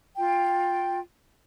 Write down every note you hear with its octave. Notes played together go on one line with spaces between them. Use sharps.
F4 G5